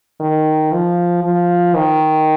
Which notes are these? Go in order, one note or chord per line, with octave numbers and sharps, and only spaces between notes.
D#3
F3
F3
D#3